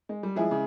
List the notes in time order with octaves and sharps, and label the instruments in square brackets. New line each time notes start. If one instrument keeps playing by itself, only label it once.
[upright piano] G#3
G3
[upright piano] F3 [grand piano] G#3 E4 G#4
[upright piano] C#3